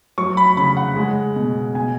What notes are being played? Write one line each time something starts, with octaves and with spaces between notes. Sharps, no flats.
F#3 C#6
B5
C#3 B5
F#5
G#3
B2
B2 G#5